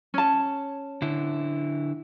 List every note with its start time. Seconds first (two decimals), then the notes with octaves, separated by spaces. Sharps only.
0.14 C#4 A5
1.02 D3 E4